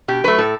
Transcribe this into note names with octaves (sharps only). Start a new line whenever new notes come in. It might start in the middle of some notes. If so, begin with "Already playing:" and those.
B2 G4
F#3 A3 B4
A2 A4